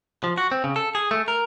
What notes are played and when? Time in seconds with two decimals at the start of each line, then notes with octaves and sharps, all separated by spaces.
0.24 F3
0.38 F#4
0.52 C4
0.64 C#3
0.76 A4
0.95 G#4
1.11 A3
1.28 A#4